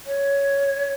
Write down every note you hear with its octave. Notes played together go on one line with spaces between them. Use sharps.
C#5